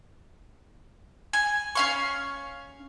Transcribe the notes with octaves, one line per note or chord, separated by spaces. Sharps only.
G#5
C#4 F5 C#6